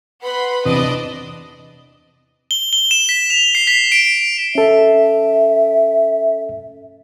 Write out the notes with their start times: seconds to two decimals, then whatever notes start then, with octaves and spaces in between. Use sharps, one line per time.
0.23 B4 F#5 B5 C6
0.66 E2 C3 D4 D5 D#5 D#6
2.51 G7
2.73 G7
2.91 E7
3.09 B6
3.30 F7
3.55 C7
3.67 B6
3.92 D7
4.55 C#4 A4 E5